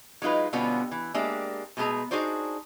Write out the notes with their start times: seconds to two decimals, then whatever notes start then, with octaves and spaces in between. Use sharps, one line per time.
0.22 F#3 G#3 D#4 F4 B4
0.53 B2 D3 G3 B3 C#4 F4
0.91 E3
1.14 G#3 A#3 D4 G4 E5
1.77 B2 G#3 A3 G#4 A#5
2.11 D4 D#4 F#4 G#4 C5 D5